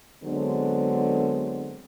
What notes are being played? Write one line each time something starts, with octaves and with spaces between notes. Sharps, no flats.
D3 F#3 G#3 B3 C4